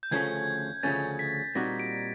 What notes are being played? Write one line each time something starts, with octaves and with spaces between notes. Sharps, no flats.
G6
D2 C#3 F3 A3 C#4 G#6
D2 C#3 F3 A3 C#4 A6
B6
A#2 G3 C4 D#4 F#4 A#6
D7